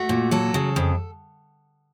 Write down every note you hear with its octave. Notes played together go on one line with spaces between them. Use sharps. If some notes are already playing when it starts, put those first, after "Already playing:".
Already playing: A3 F#4
A#2
F#3 A4
C#3
F2